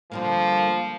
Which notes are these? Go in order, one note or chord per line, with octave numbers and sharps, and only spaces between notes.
D3 F3 G3 A#3